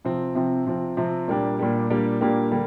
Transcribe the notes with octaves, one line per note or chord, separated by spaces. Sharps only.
C3 F3 C4
C3 F3 C4
C3 F3 C4
C3 F3 C4
A#2 G3 A#3 D4 G4
A#2 G3 A#3 D4 G4
A#2 G3 A#3 D4 G4
A#2 G3 A#3 D4 G4
D3 G3 A#3